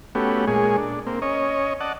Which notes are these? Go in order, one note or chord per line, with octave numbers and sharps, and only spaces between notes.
A3 B3 C#4 F#4 G4
A#2 G#3 G#4 C#5
D4
A#3 C4
C#4 C#5 D#5
D5 D#5 F#5 A5